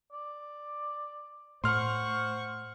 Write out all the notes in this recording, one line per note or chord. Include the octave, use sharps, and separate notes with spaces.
D5
A2 C5 F#5 C6 C#6 F6